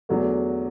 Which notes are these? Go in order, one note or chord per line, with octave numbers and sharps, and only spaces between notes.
E2 D3 F#3 A3 F#4